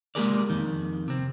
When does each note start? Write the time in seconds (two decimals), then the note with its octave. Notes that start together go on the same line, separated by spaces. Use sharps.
0.15 G#3 A#3 G4 G#4 A#4 D5
0.50 F2 D#3
1.08 C3 C4